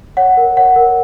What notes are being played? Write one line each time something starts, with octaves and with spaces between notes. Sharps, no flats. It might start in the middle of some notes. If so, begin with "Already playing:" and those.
C#5 F#5
A#4
C#5 F#5
A#4